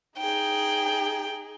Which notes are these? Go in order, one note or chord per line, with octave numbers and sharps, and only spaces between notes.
D#4 G#4 G5